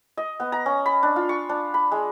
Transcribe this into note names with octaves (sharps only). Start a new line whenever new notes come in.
D#5
B3
A#5
C#4
B5
D4
F4
C#6
D4
B5
G#3